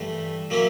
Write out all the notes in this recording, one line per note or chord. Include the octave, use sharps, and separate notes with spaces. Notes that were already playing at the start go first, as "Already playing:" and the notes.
Already playing: G2 E3 A3
F#3 A#3 C#4 E4